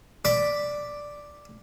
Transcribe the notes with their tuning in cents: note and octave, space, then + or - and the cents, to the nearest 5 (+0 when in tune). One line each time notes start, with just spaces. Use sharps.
D5 +0 B5 +0